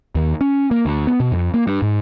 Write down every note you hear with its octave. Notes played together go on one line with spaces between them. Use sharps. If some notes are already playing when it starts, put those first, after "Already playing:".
D#2
C#4
A#3
D2
B3
B2
F2
A#3
G2
G#2